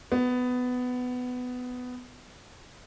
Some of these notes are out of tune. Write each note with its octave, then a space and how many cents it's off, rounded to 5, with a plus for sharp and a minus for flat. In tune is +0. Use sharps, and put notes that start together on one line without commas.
B3 +15